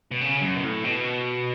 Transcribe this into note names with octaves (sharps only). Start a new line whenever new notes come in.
B2
C#3
F#2
B2
A2
B2